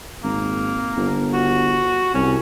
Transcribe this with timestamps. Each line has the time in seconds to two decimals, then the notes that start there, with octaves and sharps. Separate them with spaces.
0.24 G#1 A#3
0.97 G1
1.34 F#4
2.14 C2 C#4